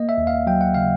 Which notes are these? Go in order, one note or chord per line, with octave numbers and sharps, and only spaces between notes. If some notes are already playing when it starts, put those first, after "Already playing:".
Already playing: A#3 D#5
E5
D#2
F5
F#3 G5
F#5
C#3 F5